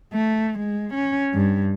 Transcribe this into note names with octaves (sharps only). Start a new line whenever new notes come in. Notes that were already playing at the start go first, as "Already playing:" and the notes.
A3
G#3
C#4
G2